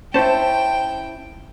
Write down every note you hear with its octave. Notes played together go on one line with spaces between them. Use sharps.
C#4 E4 C5 G5 A5